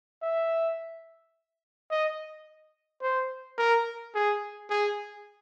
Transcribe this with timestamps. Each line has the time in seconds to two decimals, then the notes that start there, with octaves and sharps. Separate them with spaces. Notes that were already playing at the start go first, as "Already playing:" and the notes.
0.23 E5
1.91 D#5
3.02 C5
3.58 A#4
4.15 G#4
4.70 G#4